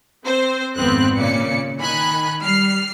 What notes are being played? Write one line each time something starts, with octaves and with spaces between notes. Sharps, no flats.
C4 C5
G#1 F2 B3 C4 F#6
A#2 C#3 D5 C#7
D#3 G#5 B5 F#6
G3 F6 C7